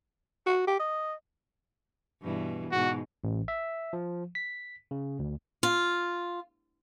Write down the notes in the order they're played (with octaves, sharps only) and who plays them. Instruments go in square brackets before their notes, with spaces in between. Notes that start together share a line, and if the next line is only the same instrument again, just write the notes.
[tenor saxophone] F#4
G4
D#5
[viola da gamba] G2 B2 E3
[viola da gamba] G#2 B2 [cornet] F#4
[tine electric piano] A1
E5
F3
B6
C#3
D2
[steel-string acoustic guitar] F4